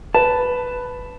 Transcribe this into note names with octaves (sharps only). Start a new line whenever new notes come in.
B4 A5